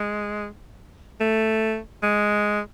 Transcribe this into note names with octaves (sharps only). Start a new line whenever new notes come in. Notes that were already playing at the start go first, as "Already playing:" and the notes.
Already playing: G#3
A3
G#3